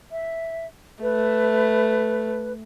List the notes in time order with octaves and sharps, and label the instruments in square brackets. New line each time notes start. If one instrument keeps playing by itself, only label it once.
[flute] E5
[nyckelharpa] A3 [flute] B4